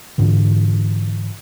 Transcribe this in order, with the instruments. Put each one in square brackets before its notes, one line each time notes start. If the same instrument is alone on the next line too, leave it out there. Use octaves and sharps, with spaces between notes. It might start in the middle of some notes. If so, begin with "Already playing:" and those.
[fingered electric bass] G#2 D3 E3